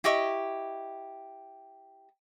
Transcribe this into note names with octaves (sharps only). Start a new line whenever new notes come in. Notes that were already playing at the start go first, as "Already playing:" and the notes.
E4 G4 D#5 C#6